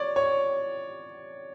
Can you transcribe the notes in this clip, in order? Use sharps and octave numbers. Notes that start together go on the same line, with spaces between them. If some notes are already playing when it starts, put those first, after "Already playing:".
Already playing: C#5 D5
C#5